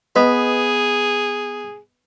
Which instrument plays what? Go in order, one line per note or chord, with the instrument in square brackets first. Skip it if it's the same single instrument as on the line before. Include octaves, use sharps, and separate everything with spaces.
[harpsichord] B3 B5 [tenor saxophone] G#4 [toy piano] B4 D#5